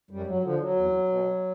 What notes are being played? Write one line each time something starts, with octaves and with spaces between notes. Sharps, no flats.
F#2 G3
F#3
D3 F3
F#3
E2
B2